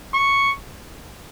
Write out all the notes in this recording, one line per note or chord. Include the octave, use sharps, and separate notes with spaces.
C#6